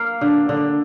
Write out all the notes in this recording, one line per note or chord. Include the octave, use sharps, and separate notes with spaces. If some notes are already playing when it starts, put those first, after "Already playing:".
Already playing: A#3 F5
D3
D3